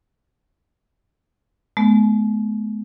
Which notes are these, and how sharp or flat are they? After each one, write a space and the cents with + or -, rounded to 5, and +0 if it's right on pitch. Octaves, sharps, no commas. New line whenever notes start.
G#3 +45 B3 -5